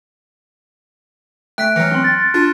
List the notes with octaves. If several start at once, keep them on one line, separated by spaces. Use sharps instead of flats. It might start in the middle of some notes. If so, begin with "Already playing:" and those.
A3 G5 F#6 B6 D7
E3 F#3 F6 A#6 C#7
C4 C6 C#6
A6
D4 F4